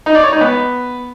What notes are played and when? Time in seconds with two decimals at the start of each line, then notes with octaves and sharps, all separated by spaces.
0.06 D#4
0.15 D5
0.24 C#5
0.32 D#4
0.41 B3